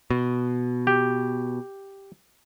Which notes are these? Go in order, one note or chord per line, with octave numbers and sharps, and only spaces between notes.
B2
G4